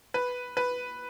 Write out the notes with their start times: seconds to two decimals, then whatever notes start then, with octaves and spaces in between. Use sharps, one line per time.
0.14 B4
0.57 B4